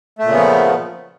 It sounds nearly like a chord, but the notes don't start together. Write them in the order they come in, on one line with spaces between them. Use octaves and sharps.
A3 A#2 C#3 B3 F3